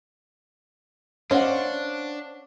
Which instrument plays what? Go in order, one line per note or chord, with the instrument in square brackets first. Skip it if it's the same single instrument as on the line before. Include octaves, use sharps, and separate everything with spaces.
[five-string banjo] C#4 [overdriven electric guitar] D4 [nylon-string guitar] C5 [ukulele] D#5 F5 F#5